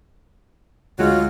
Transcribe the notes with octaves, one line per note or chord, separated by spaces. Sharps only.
D2 F#3 G#3 F4